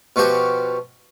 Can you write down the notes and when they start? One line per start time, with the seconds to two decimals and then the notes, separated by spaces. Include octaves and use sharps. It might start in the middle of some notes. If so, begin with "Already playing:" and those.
0.16 B2 F3 F#4 G4